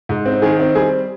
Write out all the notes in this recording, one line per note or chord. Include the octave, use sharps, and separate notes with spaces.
G#2
C4
D#3 G#4
C4
G3 G#4